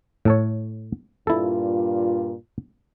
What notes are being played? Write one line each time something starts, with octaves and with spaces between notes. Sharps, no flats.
A2 A4 C#5
G2 A#2 E4 F4 A4